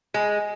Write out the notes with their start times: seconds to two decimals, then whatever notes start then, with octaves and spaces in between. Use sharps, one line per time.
0.14 G#3